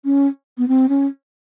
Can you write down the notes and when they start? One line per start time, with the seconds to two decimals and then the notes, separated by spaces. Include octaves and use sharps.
0.05 C#4
0.58 B3
0.68 C4
0.89 C#4